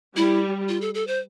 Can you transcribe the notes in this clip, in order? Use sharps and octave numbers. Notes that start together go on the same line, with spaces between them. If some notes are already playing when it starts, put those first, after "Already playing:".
G3 E4
F4
A4
A4
C5